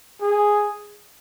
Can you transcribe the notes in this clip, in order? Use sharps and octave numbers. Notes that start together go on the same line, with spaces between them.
G#4